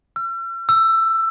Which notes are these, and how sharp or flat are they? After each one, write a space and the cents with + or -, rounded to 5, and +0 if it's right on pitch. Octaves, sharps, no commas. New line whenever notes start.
E6 +45
E6 +15